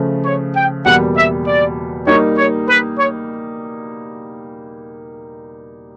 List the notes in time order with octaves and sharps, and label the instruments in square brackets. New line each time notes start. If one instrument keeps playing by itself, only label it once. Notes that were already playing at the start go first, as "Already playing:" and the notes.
Already playing: [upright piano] C#3 F3 A3
[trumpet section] C#5
G5
[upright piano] E2 B2 G3 A#3 [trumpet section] F#5
[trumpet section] E5
D5
[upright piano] G3 A#3 D#4 [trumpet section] C#5
[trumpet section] C#5
B4
C#5